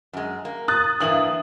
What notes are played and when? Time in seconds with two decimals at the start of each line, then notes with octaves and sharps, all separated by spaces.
0.13 F#2 G#3
0.45 A#3
0.68 D#6 F#6 A6
1.00 G2 E3 A#3 D#6 F#7